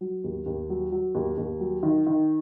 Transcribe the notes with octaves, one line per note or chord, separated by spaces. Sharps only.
F#3
D#2
D#2
F#3
F#3
D#2
D#2
F#3
D#3
D#3